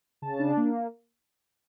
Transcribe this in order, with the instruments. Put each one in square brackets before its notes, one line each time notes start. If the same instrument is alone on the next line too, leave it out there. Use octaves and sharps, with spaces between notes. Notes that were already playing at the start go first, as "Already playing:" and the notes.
[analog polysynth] C#3 A5
D4
A#3